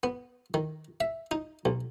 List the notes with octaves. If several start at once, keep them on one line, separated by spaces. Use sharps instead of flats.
B3
D#3
E5
D#4
B1